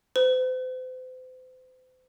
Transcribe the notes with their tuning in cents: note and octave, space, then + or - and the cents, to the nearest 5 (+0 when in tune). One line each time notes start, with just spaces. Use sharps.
C5 -40